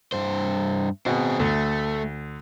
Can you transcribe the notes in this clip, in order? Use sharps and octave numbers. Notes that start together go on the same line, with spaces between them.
G2 C5
B2 C4 G#4
D2 A3